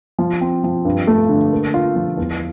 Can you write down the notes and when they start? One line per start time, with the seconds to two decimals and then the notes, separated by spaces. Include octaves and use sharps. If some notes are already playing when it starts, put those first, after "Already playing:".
0.19 F3
0.41 C4
0.64 F3
0.85 G2
1.07 A3
1.29 D3
1.52 A#3
1.74 F4
1.96 F3
2.17 E2